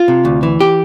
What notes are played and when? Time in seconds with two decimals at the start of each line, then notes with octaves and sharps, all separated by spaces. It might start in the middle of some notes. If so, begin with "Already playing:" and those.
Already playing: F4
0.08 C3
0.25 D2
0.43 E3
0.60 G4